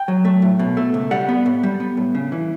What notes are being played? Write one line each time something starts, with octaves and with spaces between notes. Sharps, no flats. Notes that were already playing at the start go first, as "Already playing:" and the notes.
Already playing: G5
F#3
A3
A2
B2
A3
C#2
G3 F#5
B3
A2
G3
B3
A2
C#3
E3